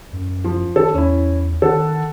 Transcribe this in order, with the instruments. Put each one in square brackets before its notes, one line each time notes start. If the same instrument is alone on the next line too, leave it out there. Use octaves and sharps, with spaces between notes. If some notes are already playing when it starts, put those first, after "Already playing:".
[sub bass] F#2
[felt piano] F3
[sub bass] D#3 [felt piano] A4 A5
[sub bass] E2 [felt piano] C#4 E4
[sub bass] D#3 [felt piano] A4 F#5